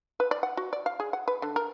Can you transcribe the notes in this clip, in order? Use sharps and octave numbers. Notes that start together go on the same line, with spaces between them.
B4
D5
F#5
F#4
D5
F5
G#4
F#5
B4
D3
A#4